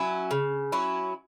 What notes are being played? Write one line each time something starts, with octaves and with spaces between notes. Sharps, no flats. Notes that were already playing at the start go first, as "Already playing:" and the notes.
Already playing: F#3 C#4 E4
C#3
F#3 C#4 E4